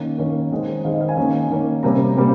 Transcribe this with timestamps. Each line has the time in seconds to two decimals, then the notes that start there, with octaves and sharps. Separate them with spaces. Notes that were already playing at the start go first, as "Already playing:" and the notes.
Already playing: D#3 A#3 C#4
0.18 D#3 A#3 C#4
0.52 D#3 G#3 C4
0.84 D#3 G#3 C4 F5
0.93 D#5
1.01 F5
1.09 G#5
1.17 D#3 A#3 C#4
1.50 D#3 A#3 C#4
1.83 C3 G3 A#3 C#4 A#5
2.17 C3 G3 A#3